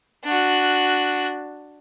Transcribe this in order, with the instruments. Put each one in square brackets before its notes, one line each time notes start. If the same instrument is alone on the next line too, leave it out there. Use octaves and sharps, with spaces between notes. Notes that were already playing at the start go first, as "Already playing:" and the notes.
[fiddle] D4 F#4